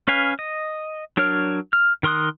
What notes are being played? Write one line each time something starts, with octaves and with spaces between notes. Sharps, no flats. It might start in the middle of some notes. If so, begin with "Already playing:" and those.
C#4 B4 F5 G#5
D#5
F#3 D4 A#4 C#5 F6
F6
D#3 A#4 C6 D#6 F#6